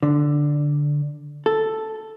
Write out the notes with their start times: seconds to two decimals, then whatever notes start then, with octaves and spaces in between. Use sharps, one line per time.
0.03 D3
1.46 A4